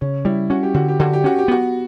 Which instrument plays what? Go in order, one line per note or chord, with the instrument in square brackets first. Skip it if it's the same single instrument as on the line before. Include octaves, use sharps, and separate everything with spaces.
[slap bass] C#3 [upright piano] C#4
[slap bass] G3 [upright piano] E4
[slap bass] C#4 [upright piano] F#4
[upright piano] G4
[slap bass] D3 [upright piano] F#4
[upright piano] G4
[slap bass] D3 [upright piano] F#4
[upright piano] G4
[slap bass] C#4 [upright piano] F#4
[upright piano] G4
[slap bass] B3 [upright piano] F#4